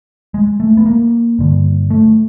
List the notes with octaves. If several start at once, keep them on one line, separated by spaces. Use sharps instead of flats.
G#3
A3
B3
A#3
G2 D3
A3